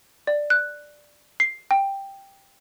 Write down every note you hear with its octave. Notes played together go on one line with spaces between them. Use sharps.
D5
F#6
C7
G5